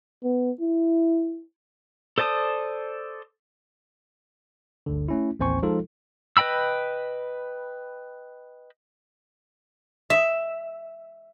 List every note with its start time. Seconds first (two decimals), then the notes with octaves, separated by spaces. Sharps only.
0.24 B3
0.61 E4
2.18 A4 C5 D5 A5 D#6
4.86 G1 D2 D3
5.08 A3 C#4 E4
5.39 A1 D#2 C4 C5 G#5 C#6
5.62 F3 G#3 D#4 F4 A4
6.37 B4 D#5 G5 B5 E6
10.10 E5